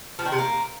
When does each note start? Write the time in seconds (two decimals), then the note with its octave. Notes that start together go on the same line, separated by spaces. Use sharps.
0.19 F3
0.25 D#3
0.32 C3
0.39 A#3